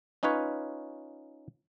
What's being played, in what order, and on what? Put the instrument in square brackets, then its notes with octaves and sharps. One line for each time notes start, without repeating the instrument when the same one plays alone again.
[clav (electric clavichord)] C#4 D#4 F4 B4 C#5